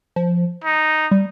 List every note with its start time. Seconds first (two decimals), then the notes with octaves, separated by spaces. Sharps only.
0.16 F3
0.64 D#4
1.11 G3